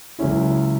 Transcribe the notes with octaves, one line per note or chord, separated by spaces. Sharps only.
C#2 C#3 F#3 C#4 E4